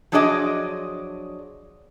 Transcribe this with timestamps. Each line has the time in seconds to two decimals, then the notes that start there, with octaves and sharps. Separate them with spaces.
0.12 F3 F#3 D4 G#4 D5 D#5